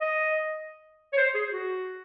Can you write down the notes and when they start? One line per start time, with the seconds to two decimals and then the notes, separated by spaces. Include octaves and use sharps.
0.01 D#5
1.13 C#5
1.18 C5
1.35 G#4
1.52 F#4